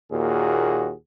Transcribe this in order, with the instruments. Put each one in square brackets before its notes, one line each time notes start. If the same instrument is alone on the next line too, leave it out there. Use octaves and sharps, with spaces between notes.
[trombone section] D#2 A#2 F#4 G#4